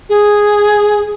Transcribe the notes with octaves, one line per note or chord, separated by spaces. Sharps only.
G#4